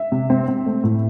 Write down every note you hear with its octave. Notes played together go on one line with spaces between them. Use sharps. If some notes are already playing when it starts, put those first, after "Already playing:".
Already playing: E5
C3
C4
C4
A3
A2